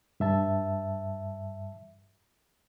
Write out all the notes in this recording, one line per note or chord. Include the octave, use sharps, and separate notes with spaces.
G2 E5 A5